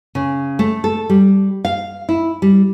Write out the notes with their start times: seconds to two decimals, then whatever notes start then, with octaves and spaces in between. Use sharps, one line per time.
0.15 C#3
0.59 A3
0.84 A4
1.10 G3
1.65 F5
2.09 E4
2.42 G3